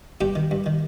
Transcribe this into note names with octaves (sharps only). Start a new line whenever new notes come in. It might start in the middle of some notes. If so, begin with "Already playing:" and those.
G2 G4 G5
D#3
G2
D#3